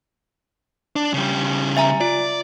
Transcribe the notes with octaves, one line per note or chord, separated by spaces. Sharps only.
D4
C#3 G3
E5 G#5 A#5
F4 D5